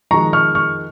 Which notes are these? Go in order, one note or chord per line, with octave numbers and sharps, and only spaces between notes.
F2 D#3 G#3 A#5 C#6
C#6 F6
C#6 F6